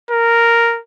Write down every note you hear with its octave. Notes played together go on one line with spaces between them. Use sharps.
A#4